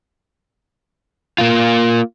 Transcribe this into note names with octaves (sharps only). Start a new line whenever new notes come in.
A#3 F4